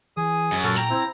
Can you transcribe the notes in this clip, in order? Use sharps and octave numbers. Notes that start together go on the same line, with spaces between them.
E3 G#4 D#6
F#2
A#2 F#4 A4 F6
G5 A#5
C4 E4